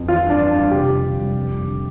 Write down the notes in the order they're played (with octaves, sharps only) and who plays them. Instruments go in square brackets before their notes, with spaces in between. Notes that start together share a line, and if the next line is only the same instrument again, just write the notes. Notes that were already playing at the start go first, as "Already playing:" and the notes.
Already playing: [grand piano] F2
E3 F4
G2
D4
G2
G3 D4
C3 G4
F2
C3
G3
F2
G3
D3